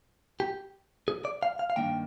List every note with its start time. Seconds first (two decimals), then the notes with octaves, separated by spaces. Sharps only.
0.40 G4
1.08 G#4
1.25 D5
1.43 F5
1.59 F5
1.70 F5
1.76 G2 D#3 A#3 D4 G5